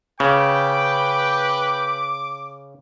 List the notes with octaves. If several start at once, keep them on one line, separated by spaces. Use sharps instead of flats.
C#3 B4 G5 D6